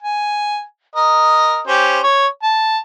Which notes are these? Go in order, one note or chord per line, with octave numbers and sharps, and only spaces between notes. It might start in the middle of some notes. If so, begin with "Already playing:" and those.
G#5
A#4 D#5
C#4 G4 C5
C#5
A5